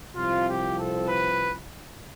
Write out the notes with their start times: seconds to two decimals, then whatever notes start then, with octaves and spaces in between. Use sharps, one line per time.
0.16 C2 C3 F3 C4 F4
0.47 G4
0.78 A4
1.07 B4